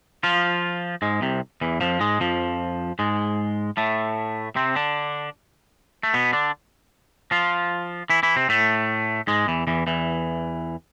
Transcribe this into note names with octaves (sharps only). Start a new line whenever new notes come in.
F3 F4
G#2 G#3
C2 C3
E2 E3
F2 F3
G#2 G#3
F2 F3
G#2 G#3
A2 A3
C3 C4
D3 D4
A3
B2 B3
D3 D4
F3 F4
E3 E4
E3 E4
C3 C4
A2 A3
G#2 G#3
E2 E3
E2 E3
E2 E3